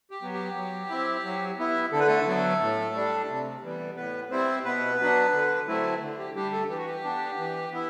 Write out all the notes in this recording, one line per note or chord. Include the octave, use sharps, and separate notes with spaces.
G4
F#3 B3
G4
F#3
C4 E4
F#3
B3 E4
D3 A4
B4
A3 A4
F#3 B3
A2
G3 D4
C3
E3 G3 B3
A2 B3 B4
G3 C4 E4 C5
B2 B3 B4
F#3 B3 D4
D3
F#3 A3 C4 E4
D3
G4
G3 D4 G4
A3 A4
E3 G4
F#4
G4
B3 D4
E3
B3 E4